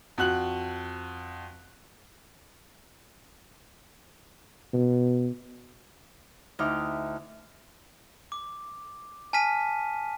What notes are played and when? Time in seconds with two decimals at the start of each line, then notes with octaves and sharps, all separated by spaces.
0.18 F2 F#4 F#6 F#7
4.73 B2
6.59 D2 D#4 E4 G5 D6 F6
8.32 D6
9.33 G#5 A5 F6 B6 D#7